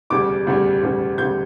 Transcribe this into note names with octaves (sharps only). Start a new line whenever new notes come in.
E1 D2 C#3 G3 D6
E1 D2 C#3 G3
E1 D2 C#3 G3
E1 D2 C#3 G3 G6